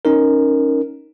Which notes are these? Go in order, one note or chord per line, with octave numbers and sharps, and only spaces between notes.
C#4 D#4 A#4